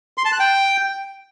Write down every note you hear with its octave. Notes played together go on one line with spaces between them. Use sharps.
C6
A5
F#6
G5